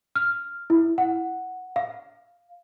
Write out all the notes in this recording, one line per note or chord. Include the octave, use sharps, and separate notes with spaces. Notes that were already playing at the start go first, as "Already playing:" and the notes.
F6
E4
F#5
F5